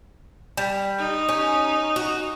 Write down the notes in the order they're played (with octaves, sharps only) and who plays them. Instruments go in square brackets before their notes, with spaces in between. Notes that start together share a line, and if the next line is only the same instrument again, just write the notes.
[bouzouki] G3
[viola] D#4
[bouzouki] C#4
F#4